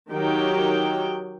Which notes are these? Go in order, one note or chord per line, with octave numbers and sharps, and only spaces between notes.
D#3 F#3 G4 G5